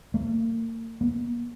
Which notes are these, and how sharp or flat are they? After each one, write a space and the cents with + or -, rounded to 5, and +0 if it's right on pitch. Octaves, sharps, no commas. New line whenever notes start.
A#3 -40
A#3 +45